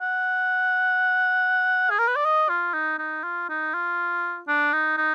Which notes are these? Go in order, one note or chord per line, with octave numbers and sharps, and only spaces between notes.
F#5
G#4
A#4
B4
D5
D#5
F4
D#4
D#4
F4
D#4
F4
D4
D#4
D#4